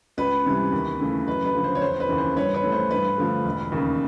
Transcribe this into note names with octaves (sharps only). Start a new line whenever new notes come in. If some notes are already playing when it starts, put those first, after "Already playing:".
C#2 B4
C3 E3 G3
D#2
C#3 E3 A3
F#2 B4
B4
D3 F3
C5
C#5
F1 C5
B4
D#2 C#3 E3
C5
G2 B4 C#5
B4 C#5
E3 A3
C5
G2 B4
D3 F3 A3
E1
D#2 C#3